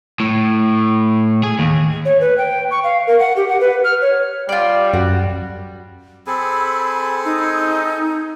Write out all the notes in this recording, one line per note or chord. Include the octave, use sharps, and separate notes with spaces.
A2
G#4
D#2
C#5
B4
G5
C#6
F5
A#4
F#5
G4
F#5
B4
F6
C#5
G3 F4 D5
F#2 F#4
C4 G#4 A4 B5
D#4